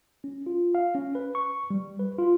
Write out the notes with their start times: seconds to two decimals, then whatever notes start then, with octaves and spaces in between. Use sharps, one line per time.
0.24 C#4
0.46 F4
0.75 F5
0.95 C#4
1.15 B4
1.35 C#6
1.70 G3
1.99 B4
2.19 F4